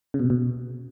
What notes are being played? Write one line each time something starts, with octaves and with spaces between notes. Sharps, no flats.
C#3
B2
C3
B2